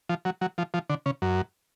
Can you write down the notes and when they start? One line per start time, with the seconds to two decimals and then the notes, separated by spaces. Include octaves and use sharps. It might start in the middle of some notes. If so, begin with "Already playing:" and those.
0.09 F3
0.25 F#3
0.41 F#3
0.58 F3
0.74 F3
0.90 D3
1.06 C#3
1.22 F#2